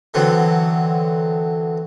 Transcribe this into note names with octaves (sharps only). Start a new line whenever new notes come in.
D3 E3 F#3 B3 C4